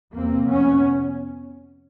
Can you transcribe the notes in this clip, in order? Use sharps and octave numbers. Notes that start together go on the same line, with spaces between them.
E2 C3 A#3 C4
F2 C3 B3 C#4